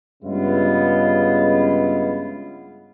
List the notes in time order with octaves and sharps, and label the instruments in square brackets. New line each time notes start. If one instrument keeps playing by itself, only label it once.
[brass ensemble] G2 C#3 G#3 B3 E4 F4